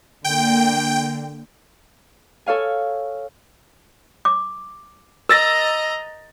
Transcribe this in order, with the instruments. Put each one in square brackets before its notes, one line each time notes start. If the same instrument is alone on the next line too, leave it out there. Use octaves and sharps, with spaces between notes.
[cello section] D3 A#3 [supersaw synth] G5
[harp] A4 C#5 F5 G#5
[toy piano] D6
[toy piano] A#4 [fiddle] D#5 A#5 [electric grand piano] E6 A6 A#6